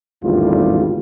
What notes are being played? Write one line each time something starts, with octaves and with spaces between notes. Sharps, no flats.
G#1 E2 A2 D3 G3 F4